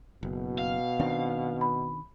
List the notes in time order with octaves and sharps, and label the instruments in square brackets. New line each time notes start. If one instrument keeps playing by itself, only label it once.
[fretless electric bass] F#1 [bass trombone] B2
[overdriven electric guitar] F5
[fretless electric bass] D#3 C4 D4
[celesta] B5